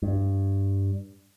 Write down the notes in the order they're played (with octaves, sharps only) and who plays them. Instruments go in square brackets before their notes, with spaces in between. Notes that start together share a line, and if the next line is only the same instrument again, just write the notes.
[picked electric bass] G2